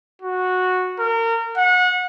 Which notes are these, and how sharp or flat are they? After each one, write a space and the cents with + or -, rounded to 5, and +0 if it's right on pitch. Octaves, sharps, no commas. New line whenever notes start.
F#4 -10
A#4 -30
F#5 -30